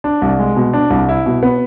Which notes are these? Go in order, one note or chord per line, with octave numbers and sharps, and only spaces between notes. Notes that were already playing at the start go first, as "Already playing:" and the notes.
D4
C2
G#3
B2
D4
C2
E4
B2
B3